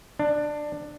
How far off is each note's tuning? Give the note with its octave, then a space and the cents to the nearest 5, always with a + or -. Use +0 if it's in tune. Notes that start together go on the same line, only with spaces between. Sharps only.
D4 +15